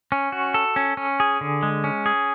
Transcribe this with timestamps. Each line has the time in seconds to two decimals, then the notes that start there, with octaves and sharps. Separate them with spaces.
0.12 C#4
0.32 F#4
0.54 A4
0.76 C#4
0.97 C#4
1.20 G#4
1.41 D3
1.63 G#3
1.84 C#4
2.06 G#4